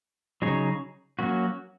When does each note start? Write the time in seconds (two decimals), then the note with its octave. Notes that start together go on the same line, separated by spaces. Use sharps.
0.42 C#3 F#3 D#4 G#4 C#5
1.19 F#3 A#3 C#4 F#4